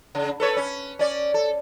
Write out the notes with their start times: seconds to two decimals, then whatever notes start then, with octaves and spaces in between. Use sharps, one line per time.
0.15 C#3
0.40 A4 B4 C#5
0.57 C#4
0.99 C#4 D5
1.34 A4